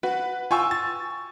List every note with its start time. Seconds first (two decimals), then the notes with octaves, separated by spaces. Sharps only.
0.03 F#4 B4
0.51 F4 G5 G#5 C#6 E6
0.71 A6